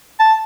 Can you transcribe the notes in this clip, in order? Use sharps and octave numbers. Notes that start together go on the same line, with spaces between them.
A5